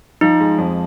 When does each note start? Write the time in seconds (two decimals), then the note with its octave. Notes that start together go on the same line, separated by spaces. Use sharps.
0.21 F3 D#4
0.40 G#3
0.58 F2